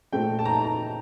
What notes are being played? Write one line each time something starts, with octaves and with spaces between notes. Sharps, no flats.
A#2 A3 C4 G5
A5
A#5
A5
A#5